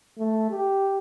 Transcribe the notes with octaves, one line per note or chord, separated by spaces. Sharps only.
A3
G4